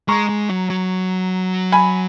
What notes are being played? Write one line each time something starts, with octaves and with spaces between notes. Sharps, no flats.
G#3 A#5 C#6
G#3
F#3
F#3
G#5 B5